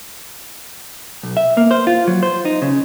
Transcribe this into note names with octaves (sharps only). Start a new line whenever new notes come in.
B1
E5
A#3
C5
F4
F#3
C5
D#4
C#3